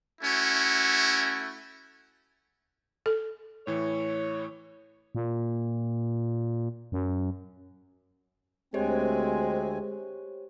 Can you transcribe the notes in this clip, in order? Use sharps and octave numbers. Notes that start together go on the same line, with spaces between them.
A3 C#4 E4 F#4
A4
A2 E3 E4 C#5
A#2
F#2
D2 G#3 C4 G4 C5 C#5 G#5